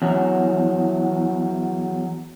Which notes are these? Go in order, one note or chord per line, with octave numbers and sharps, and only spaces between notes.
E2 F#3